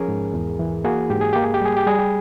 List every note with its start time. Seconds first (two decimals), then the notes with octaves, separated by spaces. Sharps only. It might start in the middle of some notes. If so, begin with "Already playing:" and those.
Already playing: F3 C#4 G#4 A#4
0.08 G#2
0.34 E2
0.59 E3
0.84 A#3 F#4 G#4
1.10 G#2 G4
1.21 G#4
1.33 A#3 G4
1.44 G#4
1.54 G4
1.61 G3 G#4
1.77 G4
1.87 G3 G#4
1.99 G4